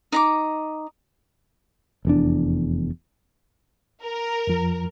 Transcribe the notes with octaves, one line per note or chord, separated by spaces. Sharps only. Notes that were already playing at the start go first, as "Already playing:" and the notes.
D#4 A#5 D6
F1 E2 D4
A#4
F2 F3